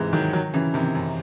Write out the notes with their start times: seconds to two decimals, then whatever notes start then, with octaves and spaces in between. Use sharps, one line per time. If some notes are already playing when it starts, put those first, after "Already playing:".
Already playing: G#2 C3 E3 G#3
0.13 D#3 F#3
0.33 D#3 F#3
0.54 C#3 E3
0.74 C3 D#3
0.95 F#2